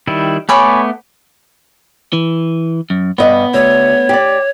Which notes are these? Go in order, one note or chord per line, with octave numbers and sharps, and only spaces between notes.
D#3 G3 E4
A3 B3 C#5 G#5 B5 D6
E3
F#2
G2 B3 D#5
D2 C#5
G4 D5